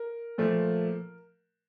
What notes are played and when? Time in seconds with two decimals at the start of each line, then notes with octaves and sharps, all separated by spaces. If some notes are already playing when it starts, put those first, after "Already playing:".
Already playing: A#4
0.38 A#2 F3 A3